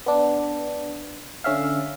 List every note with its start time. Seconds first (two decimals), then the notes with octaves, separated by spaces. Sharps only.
0.06 B3 D4
1.44 D3 C#4 E5 F5